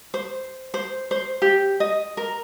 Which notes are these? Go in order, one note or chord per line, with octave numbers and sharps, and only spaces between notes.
C5
C5
C5
G4
D#5
A#4